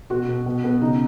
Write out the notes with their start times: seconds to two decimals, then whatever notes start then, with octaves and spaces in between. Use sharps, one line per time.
0.10 B2 F#4
0.29 B2
0.46 B2
0.64 B3
0.81 C#3 D#4